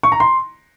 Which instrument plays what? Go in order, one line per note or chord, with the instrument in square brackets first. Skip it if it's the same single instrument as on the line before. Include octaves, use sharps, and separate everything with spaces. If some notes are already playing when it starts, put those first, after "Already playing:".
[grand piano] C#6
A#5
C6